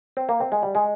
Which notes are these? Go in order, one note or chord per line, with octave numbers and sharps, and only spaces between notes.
C4
A#3
C4
G#3
G3
G#3